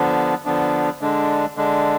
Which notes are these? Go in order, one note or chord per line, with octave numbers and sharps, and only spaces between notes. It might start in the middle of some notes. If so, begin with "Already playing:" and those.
Already playing: D3 F3 B3 D4
D3 F3 B3 D4
D3 G#3 D4
D3 G#3 D4